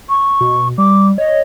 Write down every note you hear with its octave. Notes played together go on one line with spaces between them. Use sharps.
C#6
B2
G3 D6
C#5 D#5